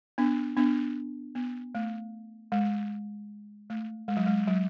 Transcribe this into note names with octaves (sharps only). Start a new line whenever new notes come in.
B3 D4
B3 D4
B3
A3
G#3
A3
G#3
F#3
G#3
F#3